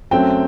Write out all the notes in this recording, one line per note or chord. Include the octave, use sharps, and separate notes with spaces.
F#2 F#3 A3 C4 G5